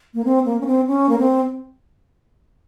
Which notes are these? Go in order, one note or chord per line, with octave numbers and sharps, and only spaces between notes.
A#3
C4
A#3
C#4
C4
C#4
A#3
C4